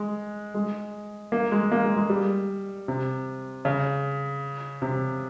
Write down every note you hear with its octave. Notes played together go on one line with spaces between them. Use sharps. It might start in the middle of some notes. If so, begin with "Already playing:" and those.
Already playing: G#3
G#3
A#3
G#3
A#3
G#3
G#3
G3
C3
C#3
C3